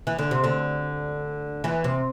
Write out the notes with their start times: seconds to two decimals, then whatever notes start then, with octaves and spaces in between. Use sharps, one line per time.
0.07 E3
0.19 D3
0.31 C3
0.44 D2 D3
1.64 E2 E3
1.84 C3